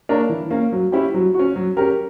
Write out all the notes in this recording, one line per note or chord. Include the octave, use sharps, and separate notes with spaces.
A#3 D4 A#4 C#5
E3
A#3 C#4
F#3
C#4 E4 G4
F#3
F#4
C#4
F#3
C#4 G4 A#4